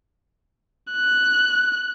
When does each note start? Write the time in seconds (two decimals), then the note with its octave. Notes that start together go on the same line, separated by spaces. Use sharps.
0.92 F#6